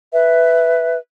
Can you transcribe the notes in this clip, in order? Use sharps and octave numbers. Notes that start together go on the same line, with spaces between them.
B4 E5